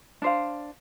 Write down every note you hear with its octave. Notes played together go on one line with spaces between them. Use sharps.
D4 C5 F5